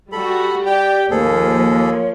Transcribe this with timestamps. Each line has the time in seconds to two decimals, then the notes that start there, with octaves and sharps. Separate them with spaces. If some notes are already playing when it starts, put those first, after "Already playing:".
0.12 G3 F#4 A4 B5
0.66 G4 D5 G5
1.11 D#2 F3 A#3 G#4 A4 C5
1.72 C#5